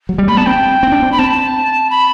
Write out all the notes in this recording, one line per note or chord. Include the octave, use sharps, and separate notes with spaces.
F#3
G3
A3 B5
B3 A5
C4 G5
C4
D4
C4
B5
C4 A5
B5